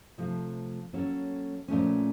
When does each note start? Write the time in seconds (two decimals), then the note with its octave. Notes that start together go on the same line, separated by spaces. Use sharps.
0.18 C3 F3 A3
0.93 F#3 A#3 C#4 A4 C#5
1.68 A#2 F3 A3 C#4